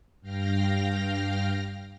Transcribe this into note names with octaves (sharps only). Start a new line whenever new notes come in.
G2 F5 G5 F6 A#6